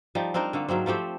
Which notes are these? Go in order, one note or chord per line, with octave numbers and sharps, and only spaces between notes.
F3 G3 D#4
C4 D4 D#4 A#4
D3 A3 A#3
G#2 F#3 A#3 C4
F3 A3 C4 G4